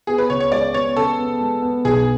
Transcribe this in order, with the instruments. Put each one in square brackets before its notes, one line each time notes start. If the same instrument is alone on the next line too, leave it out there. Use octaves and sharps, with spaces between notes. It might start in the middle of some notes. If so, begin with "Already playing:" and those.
[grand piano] B3 [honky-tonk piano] G#4
[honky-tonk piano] B4
[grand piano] C#2 [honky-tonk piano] C#5
[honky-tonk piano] C#5
[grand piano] G#3 [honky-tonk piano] D5
[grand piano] B3 [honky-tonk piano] C#5
[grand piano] C#3 [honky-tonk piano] A4
[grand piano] B3
G#3
B3
[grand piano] B1 [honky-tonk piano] G#4